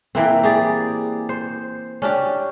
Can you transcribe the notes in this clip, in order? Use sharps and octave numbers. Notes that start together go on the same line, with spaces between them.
E3 A#3 C4
G4 G#4 D5
C5
C#4 D4 G4